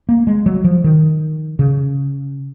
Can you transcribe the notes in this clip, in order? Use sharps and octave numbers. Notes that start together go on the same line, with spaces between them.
A#3
G#3
F#3
F3
D#3
C#3